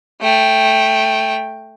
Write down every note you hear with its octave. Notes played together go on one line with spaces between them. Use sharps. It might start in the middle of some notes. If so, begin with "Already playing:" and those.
A3 G5